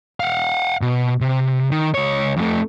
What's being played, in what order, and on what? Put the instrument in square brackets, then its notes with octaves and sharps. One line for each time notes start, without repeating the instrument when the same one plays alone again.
[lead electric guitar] F5 F#5
B2
C3
D#3
C#2 C#5
F2 A3